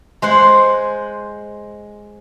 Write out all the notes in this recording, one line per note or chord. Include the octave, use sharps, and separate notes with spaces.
G#3 C5 F#5